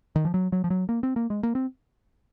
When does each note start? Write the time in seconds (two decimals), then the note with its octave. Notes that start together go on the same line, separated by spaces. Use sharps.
0.16 D#3
0.25 F3
0.34 F#3
0.52 F#3
0.64 F3
0.70 F#3
0.89 A#3
1.03 C4
1.16 A#3
1.30 G#3
1.43 A#3
1.55 C4